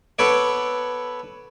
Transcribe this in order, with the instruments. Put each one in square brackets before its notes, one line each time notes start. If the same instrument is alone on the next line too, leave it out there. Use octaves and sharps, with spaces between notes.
[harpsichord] B3 A4 B4 C#5 D5